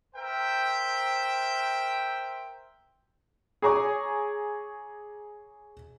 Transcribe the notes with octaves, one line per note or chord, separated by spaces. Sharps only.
A#4 C5 E5 G5
G#4 C#5 G#5 A#5 C#6 D6